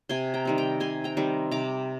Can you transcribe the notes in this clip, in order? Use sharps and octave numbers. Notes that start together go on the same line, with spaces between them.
C3 G#5 C6
G5 A#5
D#3 G3 C4
G5 A#5
C3 G#5 C6
G5 A#5
D#3 G3 C4
C3 A#5 D6